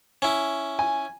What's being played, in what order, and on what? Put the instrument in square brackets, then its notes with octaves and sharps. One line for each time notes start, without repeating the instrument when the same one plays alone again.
[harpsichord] C#4 E4
[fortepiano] G#5